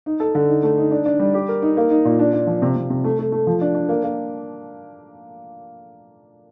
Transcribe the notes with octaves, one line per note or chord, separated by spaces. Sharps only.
D#4
A4
D3
D#4
A3
D#4
D4
D4
G3
G4
A#4
D#4
A#3
D#4
A#2
D4
D4
F3
C3
C3
C3
A3
A3
A3
F3
D4
D4
A#3
A#3